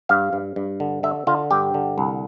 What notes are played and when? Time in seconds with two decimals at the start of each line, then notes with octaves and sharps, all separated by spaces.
0.09 G2 F5
0.33 G2
0.56 G2
0.80 D3
1.03 D3 E5
1.27 D3 F4
1.51 G2 G4
1.74 D3
1.98 C2